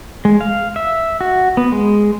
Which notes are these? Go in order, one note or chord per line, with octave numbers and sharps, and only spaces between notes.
G#3
F5
E5
F#4
B3
G#3